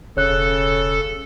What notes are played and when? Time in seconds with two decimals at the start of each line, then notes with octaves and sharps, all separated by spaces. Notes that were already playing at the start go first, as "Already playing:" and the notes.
0.17 E1 C#3 A4 C#5 F#6